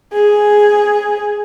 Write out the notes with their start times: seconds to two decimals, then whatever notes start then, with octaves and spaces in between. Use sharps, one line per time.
0.13 G#4